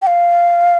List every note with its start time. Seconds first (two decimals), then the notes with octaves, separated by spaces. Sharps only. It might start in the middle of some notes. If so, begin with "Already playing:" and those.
0.02 G5
0.07 F5